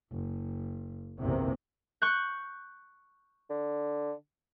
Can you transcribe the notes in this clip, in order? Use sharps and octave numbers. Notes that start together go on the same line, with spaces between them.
F#1
F#1 B1 E2 C3 A#3
C#6 F#6 G6
D3